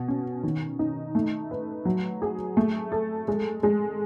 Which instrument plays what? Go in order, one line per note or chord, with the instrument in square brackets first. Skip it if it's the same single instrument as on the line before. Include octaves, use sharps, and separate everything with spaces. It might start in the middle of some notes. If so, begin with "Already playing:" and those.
Already playing: [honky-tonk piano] B2
C#4
D#3
D#4
A3
B4
F#3
G#4
A3
A4
G#3
G#3